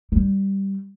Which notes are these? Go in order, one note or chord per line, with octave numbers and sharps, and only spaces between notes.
G3